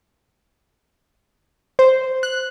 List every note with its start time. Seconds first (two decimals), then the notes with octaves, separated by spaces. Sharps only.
1.79 C5
2.23 F#6